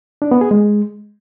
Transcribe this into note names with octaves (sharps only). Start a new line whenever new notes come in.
D4
B3
G#4
G#3